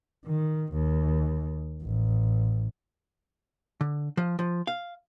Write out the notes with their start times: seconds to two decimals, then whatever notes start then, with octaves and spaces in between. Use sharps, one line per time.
0.26 D#3
0.73 D#2
1.82 A1
3.81 D3
4.17 F3
4.39 F3
4.67 F5